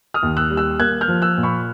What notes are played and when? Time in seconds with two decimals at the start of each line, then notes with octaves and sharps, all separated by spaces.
0.14 D#6 F6
0.23 D#2
0.37 E6 F#6
0.51 G3
0.57 E6 F#6
0.79 A#3 F#6 G#6
1.01 F6 G6
1.08 F3
1.22 E6 F#6
1.37 A#2
1.43 B5 C#6